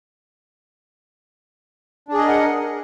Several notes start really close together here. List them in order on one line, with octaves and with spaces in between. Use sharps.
D4 G#4 D#5 A#4 F#5